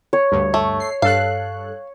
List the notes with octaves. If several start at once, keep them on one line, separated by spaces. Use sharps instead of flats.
C#5
D2 G2
A3
C7
G2 A4 F5 F#6